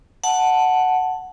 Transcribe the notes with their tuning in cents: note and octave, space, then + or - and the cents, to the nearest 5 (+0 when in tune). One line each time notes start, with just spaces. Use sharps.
F#5 +0 A5 +0